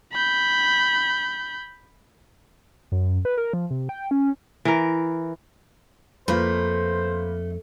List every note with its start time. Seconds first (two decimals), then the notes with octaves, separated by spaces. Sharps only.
0.13 B5 G6
2.92 F#2
3.25 B4
3.37 A#4
3.53 F3
3.71 C3
3.89 G5
4.11 C#4
4.65 E3 A#4
6.28 F2 A3 A#3 F4 B4 C5